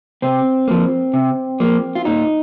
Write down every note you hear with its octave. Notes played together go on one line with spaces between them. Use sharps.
C3 C4
F3 A#3
C3
F3 A#3
F4
A#2 D#4